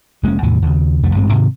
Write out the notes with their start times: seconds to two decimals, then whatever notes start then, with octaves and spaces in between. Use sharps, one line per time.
0.23 F1 G#3 A#3 C#4
0.43 E2 A2 C3 D#3
0.62 D#2 C#3
1.03 C2 F2 A3
1.14 A1 G2 G#3 C4
1.31 G#2 C3 D#3